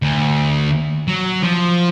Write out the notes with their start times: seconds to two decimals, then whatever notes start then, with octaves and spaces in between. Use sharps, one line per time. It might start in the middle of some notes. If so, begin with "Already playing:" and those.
0.02 D2
1.08 F#3
1.44 F3